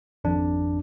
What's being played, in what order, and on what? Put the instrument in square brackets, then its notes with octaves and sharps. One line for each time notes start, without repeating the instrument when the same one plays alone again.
[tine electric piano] G#1 F2 D4